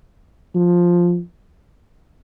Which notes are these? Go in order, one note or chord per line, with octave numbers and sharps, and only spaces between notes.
F3